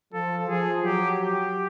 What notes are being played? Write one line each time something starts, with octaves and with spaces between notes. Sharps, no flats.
F3 A4
F3 G#4
F#3 G4
G4